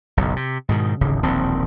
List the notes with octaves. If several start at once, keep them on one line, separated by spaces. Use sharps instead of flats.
F#1 B1
C3
G#2 B2 D#3
D1 G#1 C#3
D1 A#1 D#3 C4